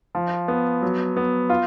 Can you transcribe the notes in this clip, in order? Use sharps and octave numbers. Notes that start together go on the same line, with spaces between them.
F3
B3
F#3
B3
F4